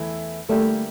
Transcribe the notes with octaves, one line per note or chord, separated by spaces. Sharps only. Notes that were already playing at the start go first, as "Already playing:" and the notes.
Already playing: E2 E3 A3 E4
D3 G3 A3 A#3 E4 G4 A4